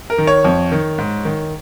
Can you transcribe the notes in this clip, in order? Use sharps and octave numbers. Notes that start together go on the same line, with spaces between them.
A#4
D#3
C#5
F2
D#3
G#2
D#3